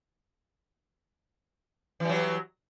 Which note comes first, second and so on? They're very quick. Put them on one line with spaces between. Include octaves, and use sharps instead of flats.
E3 G3 F#3